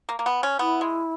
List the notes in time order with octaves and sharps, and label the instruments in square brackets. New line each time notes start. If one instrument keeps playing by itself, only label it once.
[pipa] A#3
A#3
B3
C#4
[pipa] B3 [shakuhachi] E4
[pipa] G#3